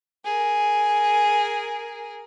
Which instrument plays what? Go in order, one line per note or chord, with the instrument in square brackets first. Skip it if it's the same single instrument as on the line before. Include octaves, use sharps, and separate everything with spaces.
[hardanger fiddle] G#4 A#4